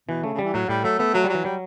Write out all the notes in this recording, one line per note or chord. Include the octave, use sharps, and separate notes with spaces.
B2 E3
C#3 A3
C#3
E3 G3
A2 F#3
A2 G3
F#3 A3
A3 B3
F#3 A3
G3
F#3
E3
F#3 G3